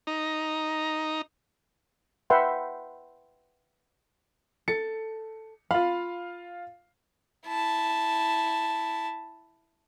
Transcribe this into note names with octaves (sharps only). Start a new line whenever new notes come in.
D#4 A#5
B4 E5 F#5 G5 C6
A4 C#7
F4 F5 B5
E4 A5